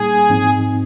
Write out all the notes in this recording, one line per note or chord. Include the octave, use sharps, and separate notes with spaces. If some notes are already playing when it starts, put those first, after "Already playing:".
Already playing: A#2 G3 A#3 D#4 G#4
G#2 F3 C4 D#4